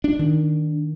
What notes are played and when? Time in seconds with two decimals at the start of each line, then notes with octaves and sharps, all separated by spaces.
0.04 D4
0.19 D#3